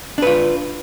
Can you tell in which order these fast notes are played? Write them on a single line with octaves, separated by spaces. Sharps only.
D4 B4 F4